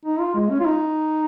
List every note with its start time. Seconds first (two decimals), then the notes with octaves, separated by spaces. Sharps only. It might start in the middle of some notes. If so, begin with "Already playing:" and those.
0.05 D#4
0.20 F4
0.35 G#3
0.50 C#4
0.60 F4
0.66 D#4